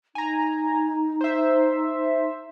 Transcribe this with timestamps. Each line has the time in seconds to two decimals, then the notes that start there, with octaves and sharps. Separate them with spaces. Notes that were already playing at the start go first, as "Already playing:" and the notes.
0.15 D#4 G#5 A#5
1.21 C5 E5